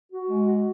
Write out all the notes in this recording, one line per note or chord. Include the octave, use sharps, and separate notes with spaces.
F#4
G#3
F#4